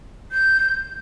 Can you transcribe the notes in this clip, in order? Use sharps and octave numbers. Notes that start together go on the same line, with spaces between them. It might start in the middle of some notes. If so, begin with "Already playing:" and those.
G6